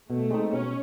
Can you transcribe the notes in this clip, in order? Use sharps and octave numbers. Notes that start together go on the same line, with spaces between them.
B2 A3
G#3 C4 D#4
B2 C#4